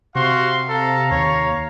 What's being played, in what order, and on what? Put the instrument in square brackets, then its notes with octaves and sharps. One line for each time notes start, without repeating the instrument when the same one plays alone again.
[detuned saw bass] C3 [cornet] F#4 [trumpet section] F5 C6
[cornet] A4 [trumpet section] F5 A#5
[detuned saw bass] D#2 [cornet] C#5